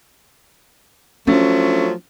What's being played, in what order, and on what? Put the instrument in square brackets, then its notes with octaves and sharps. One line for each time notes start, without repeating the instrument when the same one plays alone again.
[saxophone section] F3 F#3 A3 [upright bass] C#4 D4